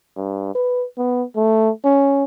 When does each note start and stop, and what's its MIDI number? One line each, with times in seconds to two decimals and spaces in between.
0.16 0.52 43
0.55 0.86 71
0.98 1.24 59
1.36 1.70 57
1.84 2.24 61